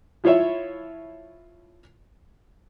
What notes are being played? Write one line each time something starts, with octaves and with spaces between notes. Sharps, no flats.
F3 E4 F4 C#5 E5